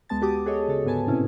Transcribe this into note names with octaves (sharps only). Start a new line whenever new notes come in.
D2 G#3 B3 A5 A6
F#4 G4 D6 D#6
F#4 G#4 A4 C#5 D#5
C#3 A4
G#2 D3 B3 B4 G#5 A5
A2 C3 C4 C#4 E4